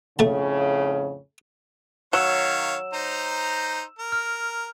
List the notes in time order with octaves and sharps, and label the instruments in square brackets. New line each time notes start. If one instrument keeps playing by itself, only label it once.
[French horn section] F2 A2 C#3 [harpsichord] A3 A5
[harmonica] D#3 C#5 F5 [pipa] F#3 [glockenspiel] E6 E7
[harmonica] D#4 C5 A#5
A#4
[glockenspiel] F6